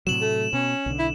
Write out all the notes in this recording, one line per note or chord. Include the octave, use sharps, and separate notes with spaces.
A2 C3 F#3 E7 F#7
A3
B2 C#4
B1 D3
E4